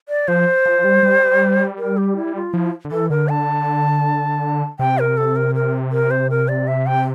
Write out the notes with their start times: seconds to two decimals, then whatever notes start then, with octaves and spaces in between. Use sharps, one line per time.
0.09 D5
0.28 F3 C5
0.66 F3
0.84 G3
1.03 G3
1.78 A#4
1.97 G4
2.16 E4
2.35 F4
2.54 F3 E4
2.85 D3
2.91 E3 A4
3.10 D3 A#4
3.29 A5
4.79 C3 G5
4.99 A#4
5.17 A4
5.36 A#4
5.55 A#4
5.92 A#4
6.11 C5
6.30 A#4
6.48 D5
6.68 E5
6.87 G5